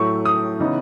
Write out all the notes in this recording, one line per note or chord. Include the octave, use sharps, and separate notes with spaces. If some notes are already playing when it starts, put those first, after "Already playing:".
Already playing: A2 F#3 A3 C#6
D#6
C#3 E3 B3 D#4